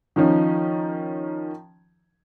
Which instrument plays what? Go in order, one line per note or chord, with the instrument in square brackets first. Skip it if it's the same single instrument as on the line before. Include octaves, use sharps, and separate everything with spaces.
[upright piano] D#3 F3 C#4 D#4